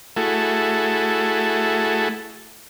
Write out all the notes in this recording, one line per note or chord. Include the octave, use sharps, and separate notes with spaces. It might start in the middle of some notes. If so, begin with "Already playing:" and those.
A3 E4 F#4 G#4 A4